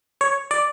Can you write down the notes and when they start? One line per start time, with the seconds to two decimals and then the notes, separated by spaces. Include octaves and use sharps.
0.21 C#5
0.51 D5